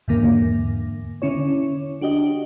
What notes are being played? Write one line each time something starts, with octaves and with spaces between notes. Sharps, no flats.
E2 G#2 D3 A#3
D3 C#4 E4 C#5
D4 F#4 G4 D#5